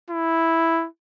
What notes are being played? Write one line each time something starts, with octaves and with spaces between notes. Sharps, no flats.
E4